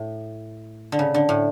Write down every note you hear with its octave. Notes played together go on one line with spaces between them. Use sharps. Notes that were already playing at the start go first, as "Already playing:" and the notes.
Already playing: A2
D3
C#3
D3
A2